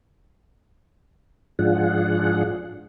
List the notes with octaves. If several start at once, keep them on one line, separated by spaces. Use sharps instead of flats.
G#2 F3 D4 F4 G#4 F#5